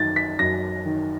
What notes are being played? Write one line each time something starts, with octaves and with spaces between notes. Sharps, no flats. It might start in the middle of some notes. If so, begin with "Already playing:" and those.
Already playing: F#2 D#3 A6
B6
F#2 A#6
D#3